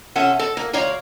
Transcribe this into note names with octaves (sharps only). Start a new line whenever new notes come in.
C3 C#4 A4 E5 F#5
A4
A#3
D2 C#5 D5 F5 A#5